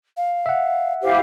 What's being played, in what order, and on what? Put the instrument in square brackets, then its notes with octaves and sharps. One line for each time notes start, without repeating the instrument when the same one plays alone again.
[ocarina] F5
[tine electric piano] E5 F#5
[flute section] E4 G4 F5 [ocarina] C5